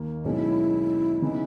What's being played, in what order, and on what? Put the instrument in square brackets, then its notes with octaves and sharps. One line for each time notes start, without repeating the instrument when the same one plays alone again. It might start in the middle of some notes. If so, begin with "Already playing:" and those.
Already playing: [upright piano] D#2 D#3 A#3
[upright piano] B1 B2 G#3 C#4 [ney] E4
[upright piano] C#3 E3 B3 D#4